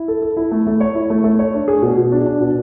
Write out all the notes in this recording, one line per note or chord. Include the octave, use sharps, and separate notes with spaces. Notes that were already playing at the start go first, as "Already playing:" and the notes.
Already playing: E4
A4
A4
E4
A3
A3
C#5
E4
A3
A3
C#5
D4
G#4
B2
B2
D4
D4
B2